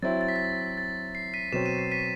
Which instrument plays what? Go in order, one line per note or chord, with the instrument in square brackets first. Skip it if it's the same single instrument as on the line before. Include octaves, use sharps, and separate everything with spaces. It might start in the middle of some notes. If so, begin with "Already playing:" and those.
[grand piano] F#3 C4 E4 [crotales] A6
[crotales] A6
B6
A6
A6
C7
B6 D#7
[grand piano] B2 F#3 C4 [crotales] E7
[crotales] D#7
C7
B6 D#7